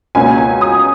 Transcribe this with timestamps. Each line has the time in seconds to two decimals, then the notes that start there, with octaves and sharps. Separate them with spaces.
0.15 C#2 B2 A#3 C#4 G#5
0.38 G#5
0.61 D#6